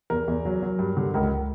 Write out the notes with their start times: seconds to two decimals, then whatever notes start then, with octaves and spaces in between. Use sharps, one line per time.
0.10 E2 A#4
0.28 E2
0.45 F#3
0.62 F#3
0.79 G2
0.97 D3
1.14 C#2 A#4